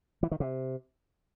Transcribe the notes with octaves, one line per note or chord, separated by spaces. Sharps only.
E3
D#3
C3